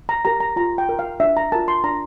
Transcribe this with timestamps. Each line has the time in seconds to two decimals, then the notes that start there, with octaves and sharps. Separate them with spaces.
0.09 A#5
0.25 G4 A#4 A#5
0.40 A#5
0.56 F4 A#5
0.78 G5
0.89 A#4
0.99 F5
1.20 D4 E5
1.37 A#5
1.52 F4 A#4 A5
1.68 C6
1.84 D4 A#5